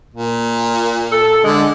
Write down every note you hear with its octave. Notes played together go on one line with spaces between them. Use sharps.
A#2
A4
D3 G#3